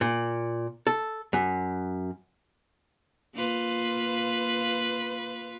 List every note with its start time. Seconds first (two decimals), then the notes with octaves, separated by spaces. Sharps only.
0.01 A#2
0.87 A4
1.33 F#2
3.35 A#3 F4 B4